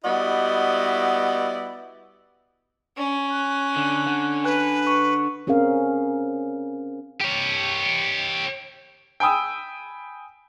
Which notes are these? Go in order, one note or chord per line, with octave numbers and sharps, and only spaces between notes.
G3 B3 E4 F#4 D5 D#5
C#4
F#6
D3
D3
B4 G#5 F#6
C#6
C4 C#4 G#4 A#4 F5
G4 C#5
G5 G#5 B5 D#6 E6